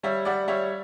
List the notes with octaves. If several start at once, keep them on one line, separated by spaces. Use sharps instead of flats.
G3 C#5 E5
G3 D5 F#5
G3 C#5 E5